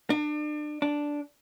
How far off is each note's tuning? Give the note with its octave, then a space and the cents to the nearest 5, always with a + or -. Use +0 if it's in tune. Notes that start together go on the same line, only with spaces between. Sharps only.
D4 +35
D4 -5